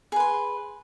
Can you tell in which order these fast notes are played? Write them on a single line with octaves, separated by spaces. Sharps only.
G#4 B4 C6